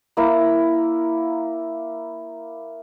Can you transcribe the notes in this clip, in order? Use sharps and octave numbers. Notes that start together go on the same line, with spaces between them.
A#3 E4 A#4